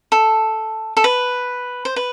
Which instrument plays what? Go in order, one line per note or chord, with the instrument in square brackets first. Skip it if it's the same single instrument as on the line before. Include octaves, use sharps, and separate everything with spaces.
[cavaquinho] A4
A4
B4
C5
B4